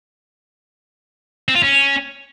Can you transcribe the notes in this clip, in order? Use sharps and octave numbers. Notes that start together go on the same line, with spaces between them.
C4
F4
C#4